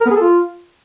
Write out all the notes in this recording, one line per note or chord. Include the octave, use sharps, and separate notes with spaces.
A#4
B3
G#4
A4
F4